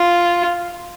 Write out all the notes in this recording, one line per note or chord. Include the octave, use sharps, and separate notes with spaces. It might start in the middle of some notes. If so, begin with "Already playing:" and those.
Already playing: F4